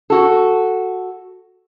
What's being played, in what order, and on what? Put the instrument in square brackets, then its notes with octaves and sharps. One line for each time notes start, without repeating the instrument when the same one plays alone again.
[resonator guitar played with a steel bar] F#4 A4